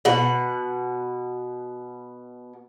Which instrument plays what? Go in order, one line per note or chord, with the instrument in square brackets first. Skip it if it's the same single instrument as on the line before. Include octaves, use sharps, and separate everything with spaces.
[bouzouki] B2 F#5